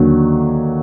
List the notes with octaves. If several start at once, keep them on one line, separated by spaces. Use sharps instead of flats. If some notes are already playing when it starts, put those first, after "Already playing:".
Already playing: D#2 D3 F#3